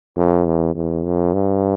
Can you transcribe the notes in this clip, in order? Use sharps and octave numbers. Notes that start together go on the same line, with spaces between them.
F2
E2
E2
F2
G2